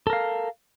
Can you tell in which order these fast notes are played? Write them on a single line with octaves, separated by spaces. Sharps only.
A4 A#4 F5